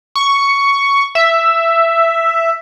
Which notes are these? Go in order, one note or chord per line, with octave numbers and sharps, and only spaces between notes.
C#6
E5